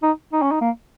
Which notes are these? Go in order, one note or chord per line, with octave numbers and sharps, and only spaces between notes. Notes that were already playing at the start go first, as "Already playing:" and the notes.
D#4
D#4
C#4
D#4
A#3